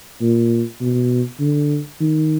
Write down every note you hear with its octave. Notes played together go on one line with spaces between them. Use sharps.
A#2
B2
D3
D#3